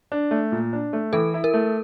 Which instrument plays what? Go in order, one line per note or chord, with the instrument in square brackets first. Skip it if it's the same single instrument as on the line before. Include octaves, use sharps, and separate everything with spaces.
[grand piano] D4
A3
A#2
D4
A3
[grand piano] E3 [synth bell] A4
[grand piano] E4
[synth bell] A#4
[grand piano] A3